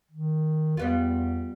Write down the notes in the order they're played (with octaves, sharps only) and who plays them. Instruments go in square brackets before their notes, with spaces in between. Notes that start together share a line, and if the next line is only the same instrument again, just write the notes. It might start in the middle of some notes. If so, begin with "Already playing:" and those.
[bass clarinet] D#3
[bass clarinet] E2 [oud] G3 B3 F4